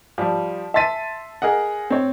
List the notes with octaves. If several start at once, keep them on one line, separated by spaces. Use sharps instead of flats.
F3 G3
E5 A5 C6 A6 B6 D#7
G#4 A#4 D#5 F#5
C4 C#5